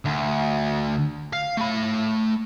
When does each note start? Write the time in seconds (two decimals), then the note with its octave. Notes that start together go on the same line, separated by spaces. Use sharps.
0.05 D2
1.33 F5
1.57 A3 B5